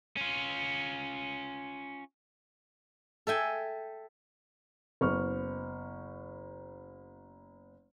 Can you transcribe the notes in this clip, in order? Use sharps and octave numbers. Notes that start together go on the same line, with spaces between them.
C#4 F4
A4 E5 G5 G#5
F#1 B3 C#6 F6